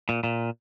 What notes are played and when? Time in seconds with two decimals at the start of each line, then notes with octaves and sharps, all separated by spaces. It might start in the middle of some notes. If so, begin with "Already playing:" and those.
0.09 A#2
0.24 A#2